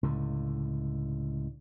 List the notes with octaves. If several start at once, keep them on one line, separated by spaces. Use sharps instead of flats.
C#2 A2 D3